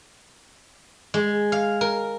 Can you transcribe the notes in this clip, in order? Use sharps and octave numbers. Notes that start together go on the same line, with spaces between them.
G#3
F5
A#4